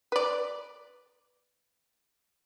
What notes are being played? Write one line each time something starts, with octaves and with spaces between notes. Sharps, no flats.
B4 D5